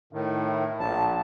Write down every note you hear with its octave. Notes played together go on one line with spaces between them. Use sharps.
A2 D#3
E4
A#1 A5